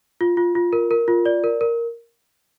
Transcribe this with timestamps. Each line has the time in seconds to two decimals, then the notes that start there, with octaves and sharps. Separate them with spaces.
0.21 F4
0.37 F4
0.55 F4
0.73 A#4
0.91 A#4
1.08 F4
1.26 D5
1.44 A#4
1.61 A#4